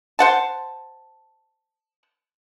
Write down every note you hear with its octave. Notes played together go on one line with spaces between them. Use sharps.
C5 F#5 A5